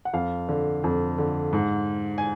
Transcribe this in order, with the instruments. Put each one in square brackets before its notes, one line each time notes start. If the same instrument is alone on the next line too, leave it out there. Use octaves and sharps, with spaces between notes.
[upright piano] F#5
F2 F5
D3
F2
D3
G#2
G#5